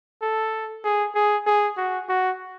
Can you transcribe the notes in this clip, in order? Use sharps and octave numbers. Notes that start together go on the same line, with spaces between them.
A4
G#4
G#4
G#4
F#4
F#4